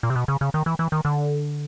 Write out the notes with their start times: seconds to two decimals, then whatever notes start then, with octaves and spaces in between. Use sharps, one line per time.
0.03 A#2
0.10 C3
0.16 B2
0.28 C#3
0.41 C#3
0.54 D#3
0.66 E3
0.79 E3
0.92 D#3
1.05 D3